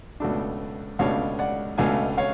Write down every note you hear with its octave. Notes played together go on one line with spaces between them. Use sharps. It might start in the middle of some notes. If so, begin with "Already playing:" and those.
C#2 B2 A3 D4
C#2 B2 A3 D4 C#5 F5
D5 F#5
C#2 B2 A3 D4 F5 G#5
C#5 F5